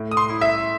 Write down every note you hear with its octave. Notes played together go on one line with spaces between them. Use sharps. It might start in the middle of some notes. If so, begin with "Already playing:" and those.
Already playing: A2
D#6
C6
E4
E5